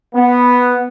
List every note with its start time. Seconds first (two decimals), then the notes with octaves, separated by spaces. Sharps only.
0.14 B3